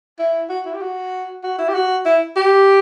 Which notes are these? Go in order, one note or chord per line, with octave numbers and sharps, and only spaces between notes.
E4
F#4
E4
G4
F#4
F#4
E4
G4
F#4
E4
G4